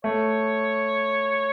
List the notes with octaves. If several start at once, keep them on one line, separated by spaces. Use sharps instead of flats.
A3 C#5